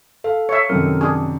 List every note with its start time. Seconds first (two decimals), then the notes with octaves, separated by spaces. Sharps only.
0.24 A4 F5
0.49 C#5 E5 C#7
0.69 F#2 C3 D#3 A4 A#4
1.01 D4 G#4 C#6